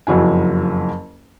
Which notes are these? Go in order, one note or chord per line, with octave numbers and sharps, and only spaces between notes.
F#1 F2 F#3 E4 G#5